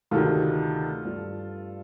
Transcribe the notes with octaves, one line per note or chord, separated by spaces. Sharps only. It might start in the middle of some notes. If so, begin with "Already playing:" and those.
D2 C3 D#3 F4 A4
G2 F3 A3